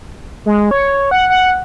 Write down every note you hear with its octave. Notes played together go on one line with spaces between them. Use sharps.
G#3
C#5
F#5
F#5